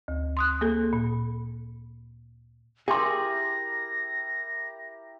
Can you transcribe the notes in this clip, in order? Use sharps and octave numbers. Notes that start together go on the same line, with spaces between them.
D2
C6 D#6 F#6
A#3 G#4 A4
A#2
E4 G4 G#4 A#4 G5 C6 A#6